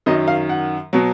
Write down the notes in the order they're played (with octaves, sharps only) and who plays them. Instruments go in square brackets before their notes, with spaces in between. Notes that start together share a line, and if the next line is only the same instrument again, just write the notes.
[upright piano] F#2 D#3 F#3 D#5
F5
F#5
B2 F#3